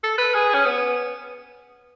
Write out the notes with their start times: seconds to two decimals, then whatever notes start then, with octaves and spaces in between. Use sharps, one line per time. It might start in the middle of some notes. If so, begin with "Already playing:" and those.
0.04 A4
0.18 B4
0.34 G#4
0.54 C#4
0.65 B3